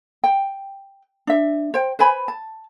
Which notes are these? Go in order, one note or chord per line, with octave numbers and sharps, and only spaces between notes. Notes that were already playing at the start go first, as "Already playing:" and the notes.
G5
D4 E5
C5 G5
B4 C5 G#5 B5
A5